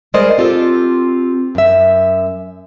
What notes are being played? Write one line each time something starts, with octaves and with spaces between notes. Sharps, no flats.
G3 G#3 A#4 C5 D5 D#5
C4 F4 G4 A4
F#2 E5